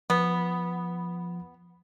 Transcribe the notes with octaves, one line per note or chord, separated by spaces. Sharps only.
F3 B3